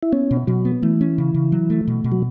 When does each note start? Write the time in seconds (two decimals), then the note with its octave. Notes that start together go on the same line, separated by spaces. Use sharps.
0.03 E4
0.12 B3 C#4
0.31 B2
0.47 B2 F#3
0.65 B3
0.82 E3 A3
1.01 C#4
1.18 C#3
1.34 C#3
1.52 F#3
1.70 A3
1.88 B2
2.04 B2
2.12 F#3